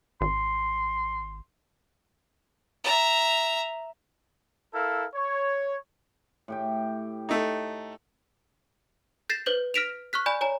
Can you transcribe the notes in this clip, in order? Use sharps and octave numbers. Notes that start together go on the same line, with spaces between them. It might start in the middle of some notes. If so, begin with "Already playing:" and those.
G#1 C6
E5 A#5
E4 A4 A#4 F5
C#5
A2 G4 G5
A3 D#4
G6 A6 A#6 C7 E7
B4 C5 G6 F#7
F6 A#6 B6 D7 E7 F7
C#6 F6 F#6 B6
D5 G#5 B5 G6
C#5 G#5 A#5